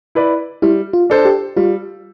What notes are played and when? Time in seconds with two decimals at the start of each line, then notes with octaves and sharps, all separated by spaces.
0.15 E4 B4 D5
0.62 G3 E4
0.93 F4
1.10 D4 A4 C5
1.25 G4
1.57 G3 F4